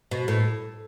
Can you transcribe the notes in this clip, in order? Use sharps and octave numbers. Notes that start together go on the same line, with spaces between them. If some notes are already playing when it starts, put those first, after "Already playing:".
B2
A2